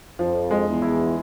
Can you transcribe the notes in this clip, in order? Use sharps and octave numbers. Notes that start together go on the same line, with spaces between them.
F2 F3
G#3
E2
E4